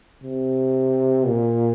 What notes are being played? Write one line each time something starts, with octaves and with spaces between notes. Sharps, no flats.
C3
A#2